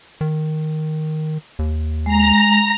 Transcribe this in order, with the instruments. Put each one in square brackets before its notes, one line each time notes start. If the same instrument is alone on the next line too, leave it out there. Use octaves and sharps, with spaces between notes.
[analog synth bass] D#3
D#2
[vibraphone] G#3 [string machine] A#5